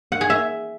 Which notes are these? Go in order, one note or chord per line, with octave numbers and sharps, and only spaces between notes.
F#5
G#4
E5